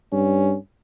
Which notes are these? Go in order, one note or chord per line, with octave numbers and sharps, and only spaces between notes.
G2 C#4